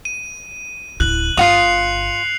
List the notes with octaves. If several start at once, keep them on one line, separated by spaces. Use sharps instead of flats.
D#7
D1 E4 F#6 F#7
G1 F4 F#4 D#6 C7 C#7 F7